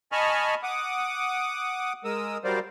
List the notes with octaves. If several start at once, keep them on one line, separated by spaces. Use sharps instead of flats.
D#5 G#5 A5 B5 C#6 F6
F#5 D6 D#6
G#3 A#4 D#6 E6
F#3 G3 A#4 C5 D5 F5